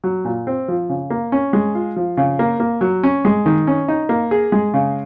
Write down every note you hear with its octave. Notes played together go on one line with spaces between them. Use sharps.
F#3
A#2
C4
F3
C#3
A#3
C#4
G#3
F4
F3
C#3
A#3
A#3
F#3
C#4
G#3
D#3
C#4
D#4
A#3
G#4
G#3
C#3